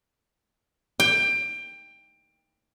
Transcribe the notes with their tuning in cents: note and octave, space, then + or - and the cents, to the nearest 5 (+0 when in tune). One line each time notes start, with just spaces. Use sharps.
G5 +20